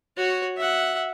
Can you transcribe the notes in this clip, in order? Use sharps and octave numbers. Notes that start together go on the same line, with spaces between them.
F#4 C#5
E5 F#5